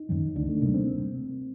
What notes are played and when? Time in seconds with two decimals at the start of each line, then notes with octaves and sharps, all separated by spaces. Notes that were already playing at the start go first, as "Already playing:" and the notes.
Already playing: D#4
0.09 F#2 D#3 F#3
0.36 D2 D4
0.49 A3
0.61 C3 G3 A#3
0.74 C4